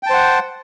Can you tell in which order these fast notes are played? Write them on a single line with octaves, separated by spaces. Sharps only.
G5 A5 C5 F#5